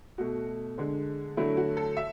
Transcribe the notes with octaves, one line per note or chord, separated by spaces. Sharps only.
B2 A3 F#4
D3 G#3
D3 F#3 A3 E4
F#4
A4
E5